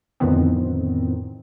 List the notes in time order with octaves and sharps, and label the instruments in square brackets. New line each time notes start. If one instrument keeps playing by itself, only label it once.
[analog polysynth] F2 A2 D3 D#3 B3 C4